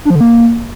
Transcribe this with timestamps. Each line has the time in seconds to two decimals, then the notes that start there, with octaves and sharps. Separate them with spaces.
0.05 D4
0.10 F3
0.15 D3
0.21 A#3